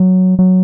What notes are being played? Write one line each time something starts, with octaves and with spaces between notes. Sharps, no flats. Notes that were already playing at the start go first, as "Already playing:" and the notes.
Already playing: F#3
F#3